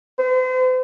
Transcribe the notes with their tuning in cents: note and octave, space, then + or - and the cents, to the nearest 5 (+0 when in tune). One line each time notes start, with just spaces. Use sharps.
C5 -40